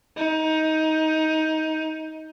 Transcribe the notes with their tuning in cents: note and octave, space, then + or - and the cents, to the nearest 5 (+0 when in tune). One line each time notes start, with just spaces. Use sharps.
D#4 +15